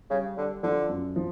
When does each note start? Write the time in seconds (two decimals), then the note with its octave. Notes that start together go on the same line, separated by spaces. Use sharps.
0.10 C#3 G3
0.37 D3 G3
0.63 D3 F3
0.89 F#2
1.16 F3